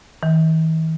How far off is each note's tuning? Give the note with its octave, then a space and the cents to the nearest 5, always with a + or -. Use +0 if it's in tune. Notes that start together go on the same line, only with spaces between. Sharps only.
E3 -45